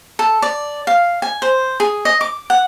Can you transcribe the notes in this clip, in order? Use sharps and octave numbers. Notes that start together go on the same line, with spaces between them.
A4
D5
F5
G#5
C5
G#4
D#5
D6
F#5